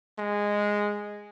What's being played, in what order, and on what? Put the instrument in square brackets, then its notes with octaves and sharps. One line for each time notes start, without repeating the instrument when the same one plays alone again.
[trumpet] G#3